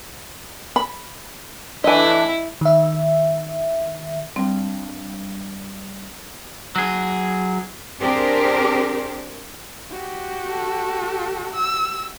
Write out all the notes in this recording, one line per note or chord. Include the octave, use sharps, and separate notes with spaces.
B5
E3 A3 D4 E4 D#5 G#5
D#3 E5
G2 G3 C4
F#3 G#4
C4 D4 G4 G#4 A#4 C5
F#4 G4
A4
E6